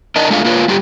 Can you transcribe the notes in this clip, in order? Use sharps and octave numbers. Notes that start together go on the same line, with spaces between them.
D4 A#4 D#5
G#3 A3 D4 F4 F5
A#3 F4 B4 C#5
G3 F4 G4